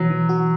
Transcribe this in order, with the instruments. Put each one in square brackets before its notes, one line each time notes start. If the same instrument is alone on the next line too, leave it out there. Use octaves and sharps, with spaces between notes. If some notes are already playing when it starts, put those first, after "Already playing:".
Already playing: [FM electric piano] B2 E3 [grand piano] F#3
[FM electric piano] E3
F#4